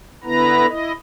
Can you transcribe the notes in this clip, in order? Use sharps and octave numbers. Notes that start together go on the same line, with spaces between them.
D3 B3 E4 B4 A#5
E4 D#5